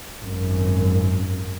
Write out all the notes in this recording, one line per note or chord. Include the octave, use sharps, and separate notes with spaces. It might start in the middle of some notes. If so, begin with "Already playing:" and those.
G#1 F#2